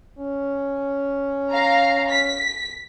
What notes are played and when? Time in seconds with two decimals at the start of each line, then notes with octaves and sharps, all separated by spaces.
0.19 C#4
1.50 F5 A#5
2.09 B6